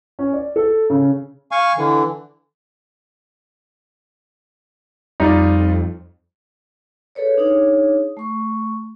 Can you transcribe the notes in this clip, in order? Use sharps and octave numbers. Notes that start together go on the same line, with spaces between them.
C#4
D5
A4
C#3
F5 G#5 C#6
D3 E3
F2 G3 D#4 F4 D5
G#4 A4 B4 C#5 D5
D4 D#4 G#4 C#5 D#6
A3 C#6